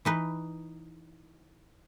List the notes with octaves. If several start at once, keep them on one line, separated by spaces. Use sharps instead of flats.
E3 D#4 B4